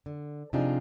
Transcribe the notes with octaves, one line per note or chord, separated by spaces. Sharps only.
D3
C3 F3 D4 D#4 F4 G#4